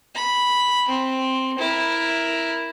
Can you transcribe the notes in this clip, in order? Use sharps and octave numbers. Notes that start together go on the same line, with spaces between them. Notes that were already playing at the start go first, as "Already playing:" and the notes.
B5
C4
E4 A#4